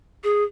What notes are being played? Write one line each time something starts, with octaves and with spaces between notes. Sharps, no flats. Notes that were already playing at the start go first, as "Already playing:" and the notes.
G#4